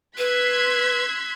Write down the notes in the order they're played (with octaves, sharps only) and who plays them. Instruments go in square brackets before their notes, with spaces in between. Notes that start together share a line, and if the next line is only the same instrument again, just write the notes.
[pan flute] B4 [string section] C6 G#6 B6 [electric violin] E6 F#6